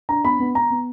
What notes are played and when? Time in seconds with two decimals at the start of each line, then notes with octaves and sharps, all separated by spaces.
0.09 D4 A#5
0.24 B3 B5
0.40 B3
0.55 B3 A#5
0.70 B3